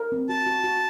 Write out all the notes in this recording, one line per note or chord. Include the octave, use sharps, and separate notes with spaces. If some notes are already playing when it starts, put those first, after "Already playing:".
Already playing: A#4
C4
F#4 A5
F#4
F#4